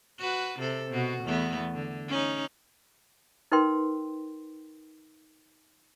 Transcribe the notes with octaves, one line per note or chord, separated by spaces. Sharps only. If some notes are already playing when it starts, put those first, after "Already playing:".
F#4 B4
C3 A4
B2 F#4
E2 A3 B3
D3
C#4 D#4
D#4 A#4 B4 G5 C6